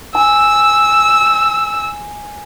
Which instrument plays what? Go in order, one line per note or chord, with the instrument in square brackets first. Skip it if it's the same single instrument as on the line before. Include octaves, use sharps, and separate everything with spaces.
[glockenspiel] G#5 [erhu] E6